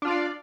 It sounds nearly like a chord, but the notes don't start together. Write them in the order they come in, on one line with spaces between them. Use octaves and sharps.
D4 F4 F5 D5